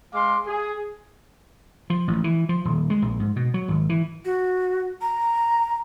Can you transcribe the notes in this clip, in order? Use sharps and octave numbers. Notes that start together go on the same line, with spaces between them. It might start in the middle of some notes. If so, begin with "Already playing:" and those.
G#3 F5 C6 D6
G#4
F3
A1
E3
F3
D#1
G#3
A#1
G#2
B2
F#3
G#1
E3
F#4
A#5